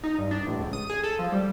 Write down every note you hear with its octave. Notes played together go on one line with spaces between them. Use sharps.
D#4
G2
D4
A1
C#2
D#6
G#4
A4
F3
G3